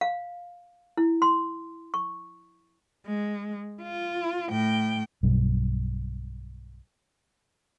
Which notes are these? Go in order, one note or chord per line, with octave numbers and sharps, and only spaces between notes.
F5
E4
C6
C#6
G#3
F4
A2 G5
B1 G2 B2